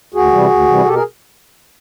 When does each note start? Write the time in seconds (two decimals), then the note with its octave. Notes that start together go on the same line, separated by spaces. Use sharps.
0.14 D2 F#4 G#4
0.32 C3 E3 G3
0.50 D2
0.67 C3 E3 G3
0.85 B2 G4 A4
0.93 G#4 A#4